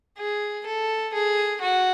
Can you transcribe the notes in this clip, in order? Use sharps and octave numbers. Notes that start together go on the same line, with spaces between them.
G#4
A4
G#4
F#4